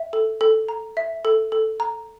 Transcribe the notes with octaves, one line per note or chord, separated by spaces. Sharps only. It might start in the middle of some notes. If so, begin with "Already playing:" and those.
Already playing: E5
A4
A4
A#5
E5
A4
A4
A#5